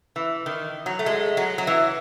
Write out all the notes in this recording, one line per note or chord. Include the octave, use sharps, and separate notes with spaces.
E3
D#3
F#3
A3
G#3
F#3
F#3
E3